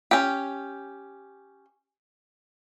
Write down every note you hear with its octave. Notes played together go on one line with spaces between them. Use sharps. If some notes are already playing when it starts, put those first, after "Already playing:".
C#4 G4